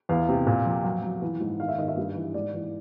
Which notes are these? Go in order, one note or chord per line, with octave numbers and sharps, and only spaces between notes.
E2 F5
C3
A#2
F3
F#3
F#3
E3
G#2
D#3 F5
E5
D#3 D#5
E5
G2
E3
G#2 D5
E3